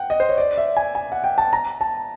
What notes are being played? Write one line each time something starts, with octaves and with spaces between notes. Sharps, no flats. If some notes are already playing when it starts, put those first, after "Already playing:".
Already playing: F#5 G5
D#5
C5
C#5
D5
E5
G#5
G#5
F#5
G5
A5
A#5
A5